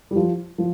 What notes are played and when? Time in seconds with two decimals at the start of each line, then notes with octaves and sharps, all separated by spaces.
0.11 G3
0.16 F3
0.58 F3